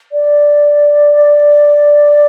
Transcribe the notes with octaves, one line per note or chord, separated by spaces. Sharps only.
D5